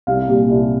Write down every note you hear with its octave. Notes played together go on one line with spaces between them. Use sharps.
C2 F5
A#2 G3
C2